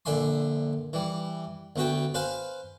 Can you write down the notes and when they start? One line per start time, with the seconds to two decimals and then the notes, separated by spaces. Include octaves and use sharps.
0.06 A#1 D3 E5 G#5 C6
0.93 E3 G3
1.76 D2 B3 F#4 G5
2.14 B4 C5 F5 G#5